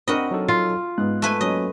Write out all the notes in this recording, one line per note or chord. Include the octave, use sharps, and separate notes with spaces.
C4 D4 F#4 A#4 D#5 B5
F#3 D#4 A4
F4
G#2 B3 F#6
A3 B4 G#5
F#3 A#3 C#4 D#5